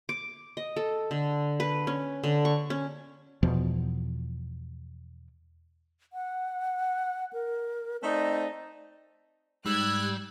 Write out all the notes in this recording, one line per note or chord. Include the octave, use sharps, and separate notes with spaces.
D6
D#5
A4
D3
B4
C#4
D3
C#6
C#4
E2 B2 F3
F#5
A#4
A3 C4 D#4 D5
G#2 G3 E6 F#6 G#6